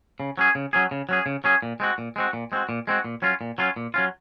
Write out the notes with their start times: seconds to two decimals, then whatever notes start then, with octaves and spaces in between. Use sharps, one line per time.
0.20 C#3
0.38 F#3 C#4 G#4
0.55 C#3
0.73 F#3 C#4 G#4
0.91 C#3
1.09 F#3 C#4 G#4
1.26 C#3
1.44 F#3 C#4 G#4
1.62 A#2
1.80 G#3 C4 F#4
1.98 A#2
2.16 G#3 C4 F#4
2.33 A#2
2.52 G#3 C4 F#4
2.69 A#2
2.87 G#3 C4 F#4
3.04 A#2
3.22 F#3 C#4 F4
3.41 A#2
3.58 F#3 C#4 F4
3.76 A#2
3.94 F#3 C#4 F4